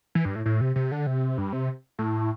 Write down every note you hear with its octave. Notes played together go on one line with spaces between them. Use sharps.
E3
G2
A2
A2
C3
C3
D3
C3
G2
C3
A2